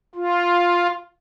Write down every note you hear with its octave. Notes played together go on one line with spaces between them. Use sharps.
F4